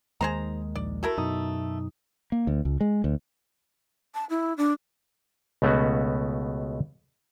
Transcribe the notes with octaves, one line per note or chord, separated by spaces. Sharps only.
D#2 D#3 G#3 G#4 C5 A#5
A#1 D5
A3 E4 F#4 A#4
F#2 B2 D#4 D#6
A#3
D2
C#2
G#3
D2
A5
E4
D4
C#2 B2 A3 B3 C#4 F#4